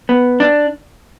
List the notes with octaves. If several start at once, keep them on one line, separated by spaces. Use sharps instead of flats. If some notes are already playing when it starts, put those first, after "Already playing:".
B3
D4